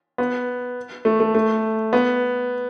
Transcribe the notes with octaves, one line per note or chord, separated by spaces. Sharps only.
B3
A3
A3
A3
B3